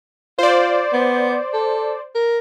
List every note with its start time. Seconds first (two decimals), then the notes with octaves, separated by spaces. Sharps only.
0.39 F4 C5 D5
0.93 B3
1.53 A4
2.15 A#4